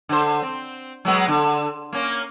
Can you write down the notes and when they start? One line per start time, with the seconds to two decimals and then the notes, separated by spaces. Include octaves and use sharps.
0.09 D3 C5
0.42 C4
1.05 F#3 G#3 B3
1.28 D3
1.93 A#3 C#4